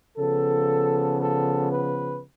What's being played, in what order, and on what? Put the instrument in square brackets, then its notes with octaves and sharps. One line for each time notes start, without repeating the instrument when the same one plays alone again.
[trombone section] C#3 F3 B3 A4
A4
B4